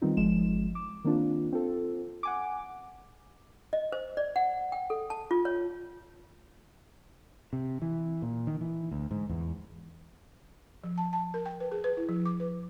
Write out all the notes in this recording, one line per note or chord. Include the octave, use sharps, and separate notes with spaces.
D#3 G3 B3 C4 D#4 F4
G1 F3 G#3 E7
D6
D#3 A#3 C4 D4 F4
C4 F4 A4
F#5 G#5 D6
D#5
C5
D5
F#5
G5
A4
A5
F4
C#5
C3
E3
A#2
D#3
E3
D2
G#2
E2
F3
A5
A5
A#4
G5
B4
G#4
B4
E4
F3
D6
B4